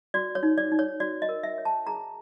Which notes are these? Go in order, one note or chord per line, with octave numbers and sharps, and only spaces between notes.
F#4 D5
C#5
D#4
D5
D#4
C#5
F#4 D5
D#5
A#4
E5
C#5
A5
G#4 A#5